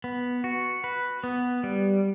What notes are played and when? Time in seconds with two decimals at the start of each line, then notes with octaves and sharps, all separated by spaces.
0.04 B3
0.44 F#4
0.84 B4
1.24 B3
1.64 G3